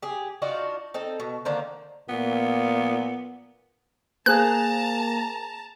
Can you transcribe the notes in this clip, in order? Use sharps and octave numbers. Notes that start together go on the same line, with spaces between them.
G4 G#4
D4 D#4 F4 F#4
C4 D#4 A4
B2
D3 D#3 A#3 C5
A#2 B3
A#3 G#4 C5 A5 A#5 F#6